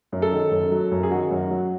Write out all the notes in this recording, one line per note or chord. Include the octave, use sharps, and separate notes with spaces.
F#2
A4
D#3
F#2
F#3
F#2
G#4
D#3 F#4
F#2
F#3